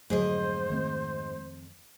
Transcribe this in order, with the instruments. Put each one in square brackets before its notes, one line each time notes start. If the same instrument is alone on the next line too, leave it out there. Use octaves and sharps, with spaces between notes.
[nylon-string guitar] F2 G#4 [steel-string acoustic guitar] G#2 D#5 [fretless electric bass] D3 F#3 A3 [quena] C5
[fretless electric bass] D#3 A3 C4